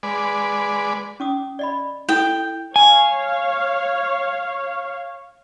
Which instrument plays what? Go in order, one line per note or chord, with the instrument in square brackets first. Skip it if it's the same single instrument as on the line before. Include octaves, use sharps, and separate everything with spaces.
[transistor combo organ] G#3 B4 D5
[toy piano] C#4 D6 D#6
D5 D#5 B5
[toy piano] E4 A4 D#6 [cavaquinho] G5
[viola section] C#5 F5 [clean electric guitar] G#5